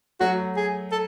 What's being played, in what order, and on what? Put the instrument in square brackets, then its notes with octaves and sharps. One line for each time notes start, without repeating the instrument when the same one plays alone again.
[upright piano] F#3 A3 [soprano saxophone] F#4
[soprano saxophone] G#4
A4